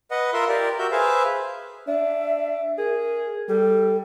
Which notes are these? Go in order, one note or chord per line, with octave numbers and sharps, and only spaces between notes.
B4 D#5 F#5
F4 A#4 E5 C6
G4 A#4 D5
F#4 A#4 E5 G6
G#4 B4 C5 E5 F5
D4 E5
G#4 A#4
G3 A4